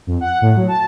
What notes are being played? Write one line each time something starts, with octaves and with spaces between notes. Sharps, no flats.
F2
F#5
A2
F#3
A5